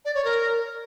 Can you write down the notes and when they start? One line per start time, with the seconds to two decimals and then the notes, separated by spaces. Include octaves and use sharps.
0.05 D5
0.15 C#5
0.24 A#4